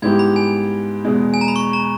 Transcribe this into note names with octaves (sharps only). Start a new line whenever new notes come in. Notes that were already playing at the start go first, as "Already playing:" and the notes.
G#2 G3 B3 E4 G4 G#6
B5
G#5
E2 B2 G#3
G#5
A#5
B5
C#6
A#5